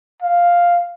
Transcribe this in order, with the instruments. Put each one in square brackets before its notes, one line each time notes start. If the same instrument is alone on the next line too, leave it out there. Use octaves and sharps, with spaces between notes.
[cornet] F5